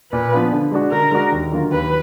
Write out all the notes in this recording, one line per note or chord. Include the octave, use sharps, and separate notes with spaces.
A#2 B4
F3 B3 D4 F4
D3
G#3 D4 F#4
D3 A#4
G#3 D4 F#4
D#2
D3 F#3 A#3 F4
D#2 B4